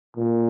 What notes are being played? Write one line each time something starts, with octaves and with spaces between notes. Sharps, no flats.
A#2